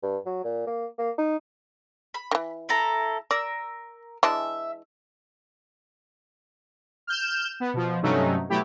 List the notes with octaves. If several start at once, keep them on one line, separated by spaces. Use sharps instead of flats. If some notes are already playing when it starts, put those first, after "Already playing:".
G2
F#3
A#2
A#3
A#3
D#4
B5
D#3 E3
E4 A4 A#5
A#4 D5 E6
E3 G#3 D4 E5
F6 G6 E7
B3
B2 F3
G2 C3 F#3 A3 C#4 D#4
B2 F#3 A3 E4 G4